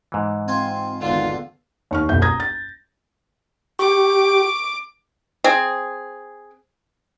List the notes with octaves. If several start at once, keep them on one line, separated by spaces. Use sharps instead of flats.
G#2 E3
C4 F4 G#5
G#1 E2 D3 F4
D#2 C#6 F6
F#1 C2 B2 E5 G6
A#5 D#6 G#6 A#6
A6
G4 C#6 D6
C4 G#4